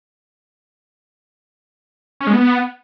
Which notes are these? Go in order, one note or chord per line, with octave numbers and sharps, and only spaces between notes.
C#4
G#3
B3